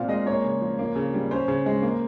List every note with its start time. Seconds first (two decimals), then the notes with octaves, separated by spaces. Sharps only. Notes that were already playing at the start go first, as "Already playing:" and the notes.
Already playing: A#2 C4 F5
0.08 G#3 D#5
0.26 A#3 C#5
0.44 C#3
0.61 F3
0.79 A#3
0.96 C#3
1.14 G3
1.31 C#4 C5
1.48 C#3
1.66 G#3
1.82 A#3